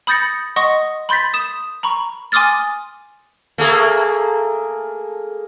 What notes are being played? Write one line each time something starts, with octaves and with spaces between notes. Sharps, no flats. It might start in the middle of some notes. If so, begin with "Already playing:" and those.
B5 D#6 G6 A6 A#6 C#7
D#5 F#5 C6 C#6 D#6 A#6
B5 C6 G6 A6 B6
D#6 E7
A#5 B5 C#6
G#5 C6 D6 D#6 F6 A6
A3 A#3 G#4